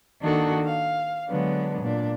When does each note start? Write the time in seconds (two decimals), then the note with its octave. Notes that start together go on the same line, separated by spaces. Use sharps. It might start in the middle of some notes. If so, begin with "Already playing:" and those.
0.20 D#3 A#3 D4 D#4 F#4 A4
0.64 F5
1.28 D3 F#3 G#3 B3 D4
1.81 A#2 D4